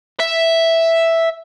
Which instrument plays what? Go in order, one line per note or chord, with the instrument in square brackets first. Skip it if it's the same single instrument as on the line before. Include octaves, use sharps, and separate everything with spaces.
[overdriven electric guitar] E5